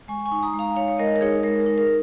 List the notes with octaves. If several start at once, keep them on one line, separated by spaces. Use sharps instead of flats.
G#3 G#5 C#6
G#5 C#6
D#4
A#5 D#6
G#3
F5 A#5
D#4 C#5 F5
C#5
G#3 A#4 D#5
A#4
D#4 G#4 C#5
G#3 A#4
A#4
D#4
A#4